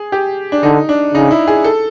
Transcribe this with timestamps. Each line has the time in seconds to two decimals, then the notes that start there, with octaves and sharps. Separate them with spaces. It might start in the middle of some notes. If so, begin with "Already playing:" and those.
Already playing: G#4
0.12 G4
0.52 D4
0.63 D3 D#4
0.89 D4
1.14 C#3 D#4
1.31 E4
1.47 G#4
1.64 A4